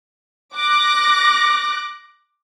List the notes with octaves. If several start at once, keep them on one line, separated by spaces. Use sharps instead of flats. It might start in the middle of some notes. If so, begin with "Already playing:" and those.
D6 F#6 A#6